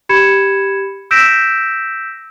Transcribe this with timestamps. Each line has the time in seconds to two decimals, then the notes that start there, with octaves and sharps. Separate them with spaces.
0.09 G4 B5 G#6 C#7 E7
1.11 E6 G6 A#6 B6 D7 E7